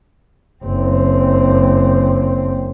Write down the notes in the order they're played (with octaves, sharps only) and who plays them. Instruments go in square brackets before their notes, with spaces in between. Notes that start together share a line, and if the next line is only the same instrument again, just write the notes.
[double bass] F#1 C4